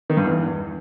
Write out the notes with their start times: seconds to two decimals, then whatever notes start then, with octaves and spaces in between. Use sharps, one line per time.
0.10 D#3
0.17 G2
0.24 E2